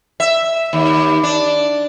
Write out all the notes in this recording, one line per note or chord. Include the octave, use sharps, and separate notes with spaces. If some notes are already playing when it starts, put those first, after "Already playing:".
E5
D#2
D4